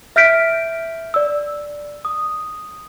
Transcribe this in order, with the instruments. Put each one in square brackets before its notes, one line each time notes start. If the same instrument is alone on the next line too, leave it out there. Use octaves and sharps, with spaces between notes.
[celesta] E5 F6 G6 B6 D7
D5 E6
D#6